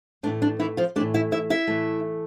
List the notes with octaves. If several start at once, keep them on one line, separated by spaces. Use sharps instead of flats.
A2 E3 A3 D4
D4
E3 E4
F3 F4
A2 E3 A3 D4 D5
E4 E5
E4 E5
E4 E5
A2 E3 A3